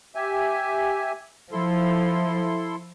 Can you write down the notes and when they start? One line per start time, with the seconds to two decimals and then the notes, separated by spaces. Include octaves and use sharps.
0.15 G4 E5 G#5
1.52 F3 E4 A4 C6